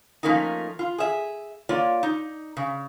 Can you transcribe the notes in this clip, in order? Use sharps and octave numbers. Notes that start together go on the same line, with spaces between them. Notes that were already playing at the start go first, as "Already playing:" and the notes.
F3 A3 A#3 C#4 D#4
F4
G#4 E5
A#3 F4 C#5 D5
D#4
C#3